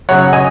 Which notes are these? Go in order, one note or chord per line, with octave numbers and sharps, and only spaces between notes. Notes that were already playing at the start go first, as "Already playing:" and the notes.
F#2 C#3 F#3 C#5 F#5
D#5 G#5